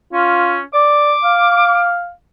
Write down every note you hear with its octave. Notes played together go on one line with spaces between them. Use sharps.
C#4 F4
D5 D6
F5